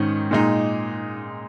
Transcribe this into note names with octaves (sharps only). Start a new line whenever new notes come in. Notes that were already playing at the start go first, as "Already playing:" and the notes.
Already playing: G#2 D#3 C#4
A#2 G#3 D#4